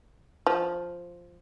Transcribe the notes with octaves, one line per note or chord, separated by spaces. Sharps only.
F3